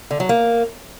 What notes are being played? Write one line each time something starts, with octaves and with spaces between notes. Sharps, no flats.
D3
F#3
A#3